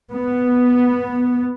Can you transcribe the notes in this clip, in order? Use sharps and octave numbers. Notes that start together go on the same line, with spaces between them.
B3